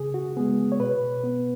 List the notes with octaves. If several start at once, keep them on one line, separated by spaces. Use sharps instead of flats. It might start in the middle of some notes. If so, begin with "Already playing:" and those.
Already playing: C#3 G#4
F#4
G#3 B3 G#4
C#5
B2 B4
B3